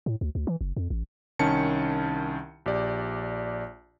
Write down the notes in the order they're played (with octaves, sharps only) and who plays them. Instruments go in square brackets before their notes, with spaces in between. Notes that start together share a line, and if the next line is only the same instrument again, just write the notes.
[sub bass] A2
D2
D2
E3
F#1
F2
A1
[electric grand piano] C2 D#3 C#4 A5 C#7
A#1 G4 D5